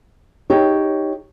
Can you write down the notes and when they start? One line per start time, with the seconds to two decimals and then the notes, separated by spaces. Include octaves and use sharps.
0.50 D#4 G4 C#5